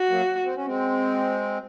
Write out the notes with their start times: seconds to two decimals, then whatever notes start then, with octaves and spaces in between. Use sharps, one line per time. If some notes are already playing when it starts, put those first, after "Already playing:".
Already playing: F#4
0.09 F#3 A#3
0.44 C4
0.55 C#4
0.66 G#3 C4